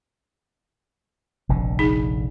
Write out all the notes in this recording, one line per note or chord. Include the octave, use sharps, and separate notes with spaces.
F1 A#1 D3
D#4 G#4